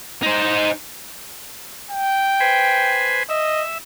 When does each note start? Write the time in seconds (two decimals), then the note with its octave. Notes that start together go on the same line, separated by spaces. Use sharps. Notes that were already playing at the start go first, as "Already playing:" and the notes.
0.22 D#4 C5
1.91 G5
2.40 B4 C5 G#5
3.29 D#5 E5